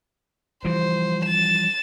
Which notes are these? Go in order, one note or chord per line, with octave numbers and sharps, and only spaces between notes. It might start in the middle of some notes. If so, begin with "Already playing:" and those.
E3 F3 G3 C5
A6 E7